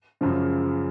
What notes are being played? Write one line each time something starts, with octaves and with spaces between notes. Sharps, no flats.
F#2 C#3 F3 G#3